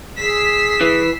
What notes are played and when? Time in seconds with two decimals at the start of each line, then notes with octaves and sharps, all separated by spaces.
0.19 G#4 E6 B6 C7
0.81 E3